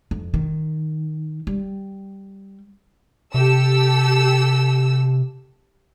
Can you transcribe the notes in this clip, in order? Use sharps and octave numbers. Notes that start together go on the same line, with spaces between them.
F2
D#3
G3
C3 G4 A4 E6